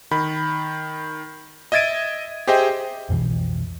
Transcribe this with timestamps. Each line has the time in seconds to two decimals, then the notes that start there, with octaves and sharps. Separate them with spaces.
0.11 D#3 B5
1.72 D#5 E5 G#6 A6 D7 D#7
2.47 G4 G#4 C5 D#5 E5 G5
3.09 B1 F2 B2 E3